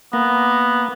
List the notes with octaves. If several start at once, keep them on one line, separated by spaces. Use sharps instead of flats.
A#3 B3